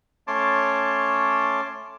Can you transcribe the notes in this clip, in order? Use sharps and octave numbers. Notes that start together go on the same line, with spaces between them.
A3 C#4 C#5 A5 C6 D6